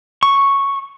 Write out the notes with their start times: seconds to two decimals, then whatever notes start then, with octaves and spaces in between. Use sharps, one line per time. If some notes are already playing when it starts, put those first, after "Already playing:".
0.23 C#6